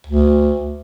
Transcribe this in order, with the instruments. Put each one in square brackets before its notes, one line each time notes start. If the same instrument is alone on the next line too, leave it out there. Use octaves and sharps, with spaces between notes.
[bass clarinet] D2